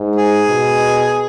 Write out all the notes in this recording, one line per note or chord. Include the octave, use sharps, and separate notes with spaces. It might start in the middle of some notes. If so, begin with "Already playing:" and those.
Already playing: G#2
G#4
B2